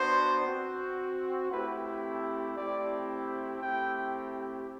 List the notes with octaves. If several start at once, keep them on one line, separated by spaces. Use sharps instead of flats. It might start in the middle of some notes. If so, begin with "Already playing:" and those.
Already playing: B3 D4 F#4 C5
C4 F#4
A3 C4 E4 G4 B4
A3 C4 E4 G4 D5
A3 C4 E4 G4 G5